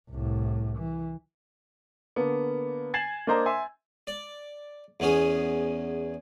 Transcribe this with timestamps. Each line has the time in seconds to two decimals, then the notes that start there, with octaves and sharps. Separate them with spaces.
0.10 C2 A2
0.78 E3
2.16 D3 A#3 B3
2.94 G#5 G#6 A6 C7 E7 F#7
3.27 A#3 D4 A#4 C5 D#5 A#5
3.46 E5 G#5 C6 E6
4.07 D5
5.00 E2 B3 C#4 G#4